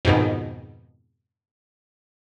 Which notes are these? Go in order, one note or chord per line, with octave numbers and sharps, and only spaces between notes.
F2 G#2 B2 D#3